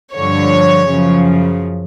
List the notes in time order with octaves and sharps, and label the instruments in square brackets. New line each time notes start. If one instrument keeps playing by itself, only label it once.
[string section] G2 D3 F3 C#5
F#2 C#3 F3